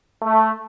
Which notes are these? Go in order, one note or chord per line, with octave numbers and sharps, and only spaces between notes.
A3